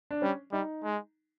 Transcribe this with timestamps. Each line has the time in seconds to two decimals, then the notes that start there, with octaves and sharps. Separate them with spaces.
0.11 D4
0.22 G3 C#4
0.53 G3 D#4
0.84 G#3